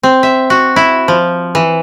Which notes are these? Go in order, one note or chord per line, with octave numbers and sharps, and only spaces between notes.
C4
E5
F#4
E4
F3
E3